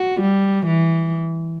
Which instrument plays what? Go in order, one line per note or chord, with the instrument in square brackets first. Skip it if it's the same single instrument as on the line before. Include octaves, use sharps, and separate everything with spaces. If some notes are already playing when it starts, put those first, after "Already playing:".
Already playing: [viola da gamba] F#4
G3
E3